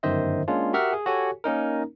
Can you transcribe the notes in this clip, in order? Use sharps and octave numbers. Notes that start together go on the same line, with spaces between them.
G1 F#2 D#3 C5 D#5 E5
G#3 A#3 C#4 D4 F4
F#4 G4 A#4 E5 F#5 F6
G#4
F#4 G4 A4 C#5 G#5
A#3 C#4 D#4 A#4